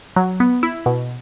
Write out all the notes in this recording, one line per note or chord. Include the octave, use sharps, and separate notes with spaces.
F#3
B3
E4
B2